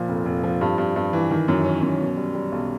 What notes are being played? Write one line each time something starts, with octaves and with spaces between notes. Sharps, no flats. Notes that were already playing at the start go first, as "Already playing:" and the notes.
Already playing: A#2 F3
F1
F1
F3
G2
G2
G2
E3
D#3
F#2
C#4
F#2
B2
G3
G3
B1